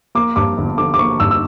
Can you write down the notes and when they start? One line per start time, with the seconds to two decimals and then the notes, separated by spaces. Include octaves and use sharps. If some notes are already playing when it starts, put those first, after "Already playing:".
0.15 A#3 D6
0.36 G2 D6
0.58 G1
0.78 D3 D6
0.94 D6
0.99 A#3 C#6
1.20 G2 E6
1.31 E6